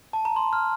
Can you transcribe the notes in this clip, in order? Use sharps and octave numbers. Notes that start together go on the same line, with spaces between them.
A5
A#5
C6
F6